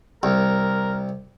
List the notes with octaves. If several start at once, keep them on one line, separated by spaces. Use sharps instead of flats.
C2 A#4